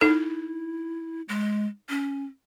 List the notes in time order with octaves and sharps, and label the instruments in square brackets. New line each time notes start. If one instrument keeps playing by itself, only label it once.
[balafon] D#4 A4 [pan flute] E4
[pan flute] G#3
C#4